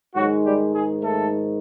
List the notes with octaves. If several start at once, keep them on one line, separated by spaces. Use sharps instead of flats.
G#2 D#3 F#3 G#3 F#4
G3 G4
G#3 G#4
A3 A4